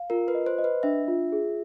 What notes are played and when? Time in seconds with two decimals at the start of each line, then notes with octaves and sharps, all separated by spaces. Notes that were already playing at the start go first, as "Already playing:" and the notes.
Already playing: F5
0.10 F4 A#4
0.28 B4
0.35 D#5
0.46 C5
0.58 D#5
0.64 B4
0.83 D4 E5
1.08 F4
1.32 G#4